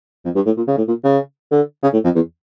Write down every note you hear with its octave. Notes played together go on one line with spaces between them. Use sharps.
F2
G2
A2
A#2
C#3
A2
A#2
C#3
D3
C#3
A2
F2
E2